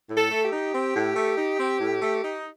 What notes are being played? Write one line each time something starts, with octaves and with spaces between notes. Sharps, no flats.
A2
A4
A3
G4
D#4
C4
A2
A3
D#4
C4
A2
A3
D#4